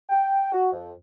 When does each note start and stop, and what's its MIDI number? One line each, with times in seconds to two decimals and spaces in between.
0.10 0.50 79
0.53 0.69 66
0.73 0.92 41